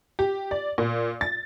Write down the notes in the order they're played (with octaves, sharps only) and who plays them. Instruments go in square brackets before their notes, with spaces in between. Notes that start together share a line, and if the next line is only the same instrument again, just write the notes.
[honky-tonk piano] G4
D5
A#2
A6